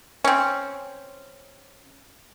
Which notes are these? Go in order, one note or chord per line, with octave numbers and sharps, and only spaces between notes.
C4 C#4